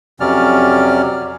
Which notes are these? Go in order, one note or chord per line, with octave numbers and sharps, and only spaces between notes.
F2 C3 F#3 C#4 D5 F6